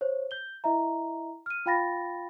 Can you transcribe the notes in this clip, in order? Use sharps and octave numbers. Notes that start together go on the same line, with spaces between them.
C5 C#5
G6 G7
E4 D#5 E5 A#5
F6 D#7
F4 F5 G5 B5 A6 A#6